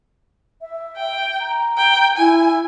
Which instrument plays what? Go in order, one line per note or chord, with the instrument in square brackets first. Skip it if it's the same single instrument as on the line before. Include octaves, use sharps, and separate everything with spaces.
[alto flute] E5
[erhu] G5
[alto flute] A#5
[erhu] G5
[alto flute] E4 [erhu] G#5